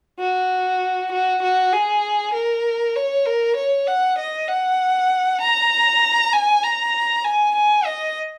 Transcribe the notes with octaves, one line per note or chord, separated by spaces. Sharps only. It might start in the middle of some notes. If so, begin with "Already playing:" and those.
F#4
F#4
F#4
G#4
A#4
C#5
A#4
C#5
F#5
D#5
F#5
A#5
G#5
A#5
G#5
G#5
D#5